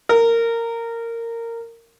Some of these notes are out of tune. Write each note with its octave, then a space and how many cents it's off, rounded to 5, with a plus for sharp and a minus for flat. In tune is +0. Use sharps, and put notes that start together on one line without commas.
A#4 -15